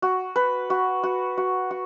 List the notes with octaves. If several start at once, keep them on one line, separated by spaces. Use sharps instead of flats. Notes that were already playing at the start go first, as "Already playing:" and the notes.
F#4
B4
F#4
F#4
F#4
F#4